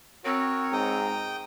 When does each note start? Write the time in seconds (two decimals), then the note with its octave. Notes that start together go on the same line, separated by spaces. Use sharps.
0.25 C4 F#4 A#4 C#5
0.73 G#2 G5 A#5 D#6